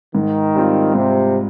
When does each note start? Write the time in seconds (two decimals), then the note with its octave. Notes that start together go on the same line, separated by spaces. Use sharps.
0.15 G#2 D#3
0.55 G3 C4 F4
0.95 G#2 C3